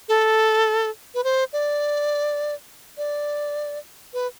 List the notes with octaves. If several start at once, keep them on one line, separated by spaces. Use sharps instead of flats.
A4
B4
C5
D5
D5
B4